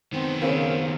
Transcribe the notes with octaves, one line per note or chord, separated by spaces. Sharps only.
D#3 B3 C4
C#3 A#3 C4 C#4